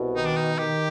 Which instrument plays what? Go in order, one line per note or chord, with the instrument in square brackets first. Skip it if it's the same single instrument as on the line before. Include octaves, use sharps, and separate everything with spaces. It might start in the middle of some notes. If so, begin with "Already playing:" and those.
Already playing: [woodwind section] C2 B2
[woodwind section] D#3 [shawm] D#4
[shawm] D4
D#4
[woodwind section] D#3 [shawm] G4